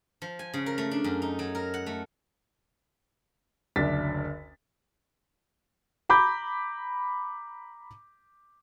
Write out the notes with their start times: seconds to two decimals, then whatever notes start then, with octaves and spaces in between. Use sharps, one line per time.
0.22 F3
0.39 G#5
0.53 C#3
0.66 A#4
0.78 A3
0.91 D4
1.04 F#2
1.22 D#4
1.39 F#3
1.55 A#4
1.74 F#5
1.86 A3
3.76 F#1 D2 D4 A6 B6
6.09 A#5 B5 D6 G6